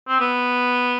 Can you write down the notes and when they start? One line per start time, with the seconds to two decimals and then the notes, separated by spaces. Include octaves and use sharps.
0.09 C4
0.20 B3